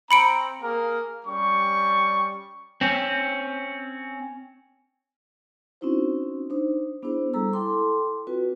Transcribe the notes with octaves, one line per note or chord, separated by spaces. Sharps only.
C4 A#5 B5 C#7 D7
A#3 G#4 A#4
G3 C#4 C#6
C4 C#4
C4 C#4 D#4 E4 F#4 C5
D4 D#4 C5
B3 D4 E4 G#4 C5
G3 G#3 A4 A#5 E6
E4 A4 G5 A5 C6 D6
C4 F4 F#4 B4